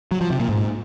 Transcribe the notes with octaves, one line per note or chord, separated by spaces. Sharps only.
F#3
F3
C3
A#2
G#2